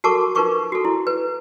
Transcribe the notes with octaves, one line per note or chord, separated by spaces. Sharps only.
F#4 A4 A#4 A5 C#6 D6
D#4 F4 A#4 B4 C#6 D6
F#4 A4
E4
B4